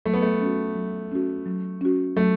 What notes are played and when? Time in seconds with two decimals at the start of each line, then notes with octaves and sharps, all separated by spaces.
0.05 F#3 A3
0.14 B3
0.22 A3
0.41 C#4 F#4
0.75 F#3
1.12 C#4 F#4
1.46 F#3
1.81 C#4 F#4
2.16 F#3 A3